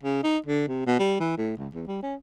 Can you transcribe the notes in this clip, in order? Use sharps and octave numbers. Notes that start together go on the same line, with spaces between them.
C#3
D#4
D3
C3
B2
G3
E3
A2
C#2
E2
G3
C#4